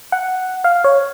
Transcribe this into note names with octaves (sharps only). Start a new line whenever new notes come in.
F#5
F5
C#5